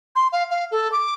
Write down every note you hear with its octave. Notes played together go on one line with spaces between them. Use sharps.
C6
F5
F5
A4
D6